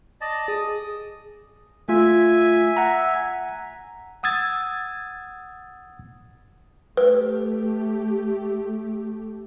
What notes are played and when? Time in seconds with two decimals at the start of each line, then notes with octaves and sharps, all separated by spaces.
0.21 D5 D#5 A5
0.48 G#4 D#6
1.89 A3 F4 E5 G#5
2.77 F#5 A#5
4.23 F#5 D#6 E6 G#6 A6
6.97 A3 G4 B4